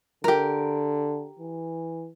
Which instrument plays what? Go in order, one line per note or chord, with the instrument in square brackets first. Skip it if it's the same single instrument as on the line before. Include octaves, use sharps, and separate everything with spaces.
[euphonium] D3 [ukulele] G4 A#4
[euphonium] E3